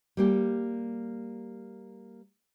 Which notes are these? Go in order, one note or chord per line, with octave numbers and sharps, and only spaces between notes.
G3 A#3 G4